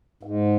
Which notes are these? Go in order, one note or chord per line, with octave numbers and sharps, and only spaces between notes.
G#2